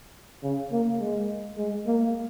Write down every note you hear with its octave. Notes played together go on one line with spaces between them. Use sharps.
C#3
A#3
G#3
G#3
A#3